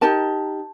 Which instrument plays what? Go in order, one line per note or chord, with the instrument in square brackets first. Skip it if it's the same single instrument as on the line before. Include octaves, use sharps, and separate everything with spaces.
[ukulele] D#4 G4 A#4 A5